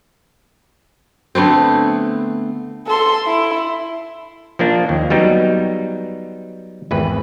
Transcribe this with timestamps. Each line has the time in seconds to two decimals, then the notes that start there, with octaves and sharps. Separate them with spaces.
1.35 D3 A3 B3 C4
2.87 A4 C6
3.26 E4
4.59 F3 A#3 D4
4.89 D#2
5.10 F#3 G3 B3 D#4
6.91 G#1 E2 B4